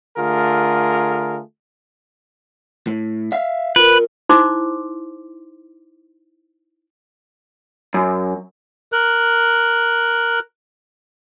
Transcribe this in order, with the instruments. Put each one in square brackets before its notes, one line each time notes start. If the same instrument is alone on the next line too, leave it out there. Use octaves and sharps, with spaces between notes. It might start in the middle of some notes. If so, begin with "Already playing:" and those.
[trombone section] D3 A3 F4 G#4 A#4
[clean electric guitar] A2
E5 F5
[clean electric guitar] F4 A#4 [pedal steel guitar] B4
[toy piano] D#4 E4 C5 C6 D6
[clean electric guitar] F#2
[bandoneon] A#4 F#6